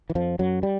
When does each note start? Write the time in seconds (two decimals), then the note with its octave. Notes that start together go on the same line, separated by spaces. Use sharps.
0.10 E3
0.15 F2 F3
0.39 F#2 F#3
0.63 G3